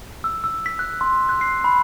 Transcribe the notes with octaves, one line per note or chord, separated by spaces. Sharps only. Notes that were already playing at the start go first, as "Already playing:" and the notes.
E6
E6
B6
F#6
C6
F#6
C7
B5